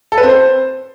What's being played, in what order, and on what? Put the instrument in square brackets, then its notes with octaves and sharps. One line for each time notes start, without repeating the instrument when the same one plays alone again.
[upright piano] A4
B4
C4
C5